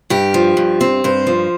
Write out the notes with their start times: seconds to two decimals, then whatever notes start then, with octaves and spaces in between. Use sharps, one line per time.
0.10 G2 G4
0.34 F3
0.57 G2
0.81 C4
1.04 G2 C5
1.27 F3